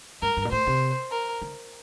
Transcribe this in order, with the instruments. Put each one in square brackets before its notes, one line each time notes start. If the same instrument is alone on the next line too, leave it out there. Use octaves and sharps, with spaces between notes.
[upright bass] G2 [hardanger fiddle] A#4
[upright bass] G2
A#2
[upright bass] A2 [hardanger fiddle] C5
[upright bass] C3
[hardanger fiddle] A#4
[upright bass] D3